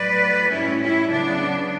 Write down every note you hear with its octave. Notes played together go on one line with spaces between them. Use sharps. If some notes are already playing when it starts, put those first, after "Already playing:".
Already playing: A2 F#3 B4 D5
A2 G3 C#4 E4
C#4 E4
C#3 F#3 B3 D4